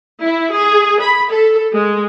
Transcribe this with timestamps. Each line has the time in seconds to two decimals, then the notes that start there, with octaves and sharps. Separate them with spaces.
0.22 E4
0.54 G#4
1.01 B5
1.30 A4
1.74 G#3